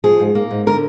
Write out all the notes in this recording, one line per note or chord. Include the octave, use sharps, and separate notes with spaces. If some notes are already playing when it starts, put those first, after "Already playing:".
F3 G#4
G#2
A#3
G#2
D3 A#4